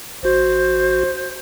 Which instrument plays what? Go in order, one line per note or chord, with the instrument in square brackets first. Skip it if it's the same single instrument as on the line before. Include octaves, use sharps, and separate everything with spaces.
[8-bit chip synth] A1 F#4 [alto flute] C5